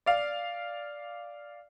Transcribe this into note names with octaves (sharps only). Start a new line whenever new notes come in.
D5 F5